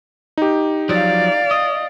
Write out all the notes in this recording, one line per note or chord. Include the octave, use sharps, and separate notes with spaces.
D#4 G4
F3 F#3 D5 F5
D#5